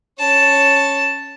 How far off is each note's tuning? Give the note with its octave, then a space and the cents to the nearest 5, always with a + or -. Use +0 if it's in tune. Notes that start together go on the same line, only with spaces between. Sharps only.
C#4 +0 A5 +0